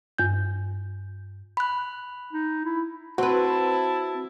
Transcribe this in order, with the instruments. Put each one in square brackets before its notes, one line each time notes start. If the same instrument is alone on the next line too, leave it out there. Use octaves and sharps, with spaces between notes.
[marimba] G2 G6
[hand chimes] B5 F#6
[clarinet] D#4
E4
[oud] C4 B4 [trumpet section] E4 A5 [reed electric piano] F#4